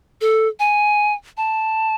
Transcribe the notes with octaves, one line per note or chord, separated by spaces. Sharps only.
A4
G#5
A5